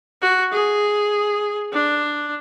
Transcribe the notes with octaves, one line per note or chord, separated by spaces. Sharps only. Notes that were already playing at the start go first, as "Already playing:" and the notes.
F#4
G#4
D4